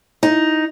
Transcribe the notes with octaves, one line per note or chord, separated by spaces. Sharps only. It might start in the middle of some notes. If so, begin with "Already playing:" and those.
D#4